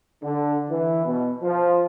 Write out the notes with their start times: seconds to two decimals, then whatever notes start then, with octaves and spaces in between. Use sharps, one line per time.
0.22 D3
0.69 E3
1.05 B2
1.43 F3